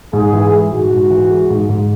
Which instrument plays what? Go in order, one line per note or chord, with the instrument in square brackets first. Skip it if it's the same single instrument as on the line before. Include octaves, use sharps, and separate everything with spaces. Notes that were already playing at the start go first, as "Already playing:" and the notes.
[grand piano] G#2 [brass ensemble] G#4
[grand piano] E3
G#3
[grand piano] G#2 [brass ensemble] F#4
[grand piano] G#2
E3
G#3
G#2
G#2